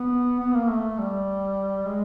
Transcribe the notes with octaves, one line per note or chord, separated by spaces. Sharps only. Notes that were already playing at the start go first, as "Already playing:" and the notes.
Already playing: B3
B3
A#3
A3
G3
G#3